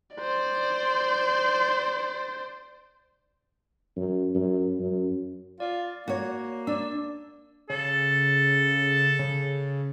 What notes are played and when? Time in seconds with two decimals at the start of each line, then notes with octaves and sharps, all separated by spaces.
0.16 C5 D5
3.97 F#2
4.35 F#2
4.80 F#2
5.60 F4 D5
6.08 A#3 F#4 C#5
6.67 D4 D5 E6
7.70 C#3 A4
9.19 C#3